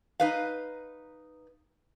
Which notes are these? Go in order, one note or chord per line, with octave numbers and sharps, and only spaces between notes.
D#4 B4 F5